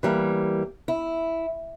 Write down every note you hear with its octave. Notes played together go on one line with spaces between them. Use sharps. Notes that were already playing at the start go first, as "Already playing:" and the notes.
E3 G3 A#3
E4